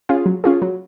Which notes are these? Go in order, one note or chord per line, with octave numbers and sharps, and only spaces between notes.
C#4 F4 G#4
F#3
C#4 F4 G#4
F#3